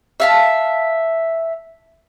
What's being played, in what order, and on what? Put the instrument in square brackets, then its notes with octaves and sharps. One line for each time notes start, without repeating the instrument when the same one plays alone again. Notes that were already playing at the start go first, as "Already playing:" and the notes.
[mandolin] E5 F5 A5